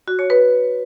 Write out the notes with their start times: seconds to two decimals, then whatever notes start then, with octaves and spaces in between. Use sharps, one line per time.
0.08 F#4
0.19 C#5
0.30 B4